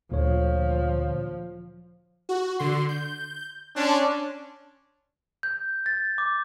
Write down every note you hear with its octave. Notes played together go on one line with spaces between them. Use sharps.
D2 A#2 D3 F3 C#5
F#4
D3 C6
G6
C#4 D4 A5 C6
G6
A6
D6